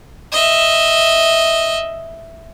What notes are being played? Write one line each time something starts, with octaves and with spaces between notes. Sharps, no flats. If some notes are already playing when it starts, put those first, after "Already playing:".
D#5 E5